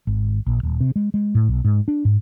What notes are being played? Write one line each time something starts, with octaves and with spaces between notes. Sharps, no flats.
G#1
A#1
D#1
C3
G#3
G#3
A2
B1
G#2
D4
G#2